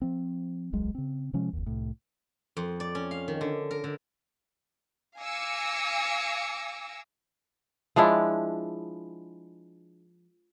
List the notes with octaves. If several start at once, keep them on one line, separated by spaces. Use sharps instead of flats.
F3 C4
D1 B1 F#3 G#3
C#3 C4
C3 F3 G#3 C#4
F1 D#2
C2 A2
F2
D5
C#4
F5
D#3
D3
A#4
D3
F5 G#5 D6 E6 A#6 C#7
F3 G#3 D4 E4